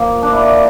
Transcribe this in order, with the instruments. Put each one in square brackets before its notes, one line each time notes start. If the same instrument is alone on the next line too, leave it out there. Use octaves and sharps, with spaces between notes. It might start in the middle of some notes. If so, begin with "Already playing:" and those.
Already playing: [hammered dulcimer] A#2 F3 A#3
D4
E4